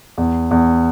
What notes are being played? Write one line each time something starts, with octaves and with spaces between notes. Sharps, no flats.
E2
E2